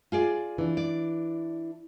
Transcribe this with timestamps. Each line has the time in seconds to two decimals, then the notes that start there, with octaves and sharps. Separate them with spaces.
0.12 F4 G#4 D5
0.58 E3 D4
0.77 D5